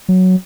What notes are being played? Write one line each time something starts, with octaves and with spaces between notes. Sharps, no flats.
F#3